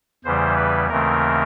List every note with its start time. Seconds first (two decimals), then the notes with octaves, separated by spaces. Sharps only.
0.25 E2 C#3 E3 G3 C5
0.57 B4
0.89 D#2 C#3 E3 A3 C4 A#4